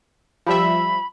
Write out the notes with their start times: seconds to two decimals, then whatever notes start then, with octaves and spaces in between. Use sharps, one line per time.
0.47 F3 G3 E5 B5